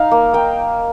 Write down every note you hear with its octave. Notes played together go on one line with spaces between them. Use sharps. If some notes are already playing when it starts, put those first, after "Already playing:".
Already playing: D#4 F5
A#3
A#3 G5